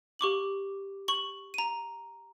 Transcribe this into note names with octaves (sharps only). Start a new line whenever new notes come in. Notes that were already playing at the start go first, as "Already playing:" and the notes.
G4 C#6 D6 F#7
C#6 F#7
A#5 D#7